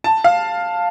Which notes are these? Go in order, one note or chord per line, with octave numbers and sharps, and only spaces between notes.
A5
F5